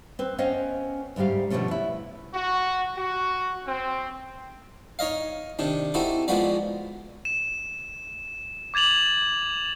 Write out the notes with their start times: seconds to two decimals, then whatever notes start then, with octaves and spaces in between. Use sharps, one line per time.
0.19 C4 B4
0.38 B3 C#4 C5 D#5 F5 G5
1.16 D2 G#2 G3 G4 F5
1.50 B2 D3 F3 F#3 A3 C#4
1.68 B3 E4
2.34 F#4
2.96 F#4
3.66 C4
4.99 D#4 C#5 D#5 F5
5.59 C3 D#3 D4
5.94 C4 D#4 E4 F#4 G4 A4
6.28 F3 G#3 A#3 B3 F#4 D5
7.25 E7
8.74 D6 G#6 A6 F7 F#7